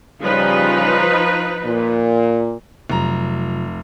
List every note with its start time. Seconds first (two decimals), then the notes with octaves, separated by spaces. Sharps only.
0.21 C#3 F3 G3 D#4 B4
1.65 A#2
2.90 F1 C3 F#3 F4 A#5